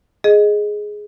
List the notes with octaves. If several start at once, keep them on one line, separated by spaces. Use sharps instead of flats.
G#4 D#5